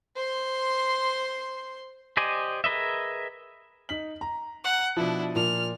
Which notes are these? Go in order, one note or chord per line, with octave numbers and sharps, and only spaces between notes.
C5 C6
G4 C5 D5 D#5 G#5
G#4 A#4 B4 D#5 E5
D#4 B6 F#7
A#5
F#5
B2 F3 D4 E4
A#2 F3 F6